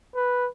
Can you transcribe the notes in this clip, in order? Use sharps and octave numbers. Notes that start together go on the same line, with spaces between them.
B4